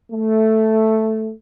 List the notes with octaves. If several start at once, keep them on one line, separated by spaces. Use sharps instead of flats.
A3